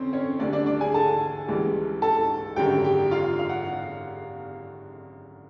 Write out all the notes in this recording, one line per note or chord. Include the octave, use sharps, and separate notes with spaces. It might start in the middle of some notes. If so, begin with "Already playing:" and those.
Already playing: F2 D3 C4 C#4 C5
C#4 C#5
D2 D3 G3 D4 D5
D4 D5
D4 D5
G#4 G#5
A4 A5
C#2 C#3 E3 G3
A4 A5
G#1 F#2 D3 G3 G4 G5
G4 G5
F4 F5
F5
F#5